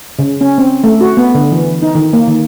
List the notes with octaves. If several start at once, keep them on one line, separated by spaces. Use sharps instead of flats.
C#3
C#4
C4
A3
F#4
B3
D3
E3
D#4
D#3
A#3
D#3